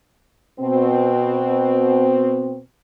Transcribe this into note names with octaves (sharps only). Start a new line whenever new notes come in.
B2 C4